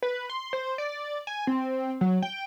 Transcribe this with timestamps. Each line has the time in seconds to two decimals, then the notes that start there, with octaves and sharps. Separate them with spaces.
0.03 B4
0.30 C6
0.53 C5
0.78 D5
1.27 G#5
1.47 C4
2.01 F#3
2.22 G5